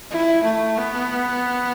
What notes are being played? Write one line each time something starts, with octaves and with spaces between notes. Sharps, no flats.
E4
A3
B3